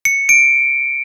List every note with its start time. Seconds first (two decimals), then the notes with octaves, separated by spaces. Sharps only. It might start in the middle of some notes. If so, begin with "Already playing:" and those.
0.05 C#7
0.29 D7